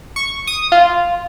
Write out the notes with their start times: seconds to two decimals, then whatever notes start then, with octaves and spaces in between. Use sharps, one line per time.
0.16 C#6
0.47 D#6
0.72 F4